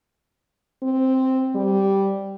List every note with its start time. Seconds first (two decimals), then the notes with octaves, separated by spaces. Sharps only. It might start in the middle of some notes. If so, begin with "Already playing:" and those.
0.83 C4
1.55 G3